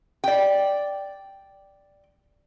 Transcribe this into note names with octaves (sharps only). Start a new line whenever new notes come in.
D5 G5